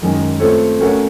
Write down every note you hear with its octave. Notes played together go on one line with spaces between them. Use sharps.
F#2 D#3 G#3 C#4
A3 C4 F4 A4 C#5
A3 C#4 F#4 A#4 C#5